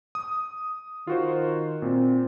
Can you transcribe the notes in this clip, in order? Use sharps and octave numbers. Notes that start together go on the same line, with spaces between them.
D#6
D#3 F4 F#4 C5
A#2 C4